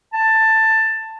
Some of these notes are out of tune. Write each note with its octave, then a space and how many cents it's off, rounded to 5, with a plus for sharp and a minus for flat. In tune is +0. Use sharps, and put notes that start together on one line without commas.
A5 +10